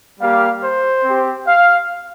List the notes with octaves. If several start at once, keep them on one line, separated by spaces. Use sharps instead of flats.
G3 A#3 G4 F5
C5
C4 G4
F5